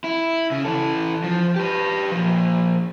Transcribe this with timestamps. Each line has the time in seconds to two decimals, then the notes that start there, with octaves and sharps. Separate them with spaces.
0.04 E4
0.51 C#3
0.65 E3 A4
1.24 F3
1.56 G4 B4
2.12 A#2 F3